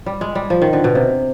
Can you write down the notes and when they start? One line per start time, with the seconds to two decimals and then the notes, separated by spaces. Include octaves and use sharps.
0.06 G3
0.21 G#3
0.35 G3
0.50 F3
0.62 D#3
0.73 D3
0.84 B2
0.95 C3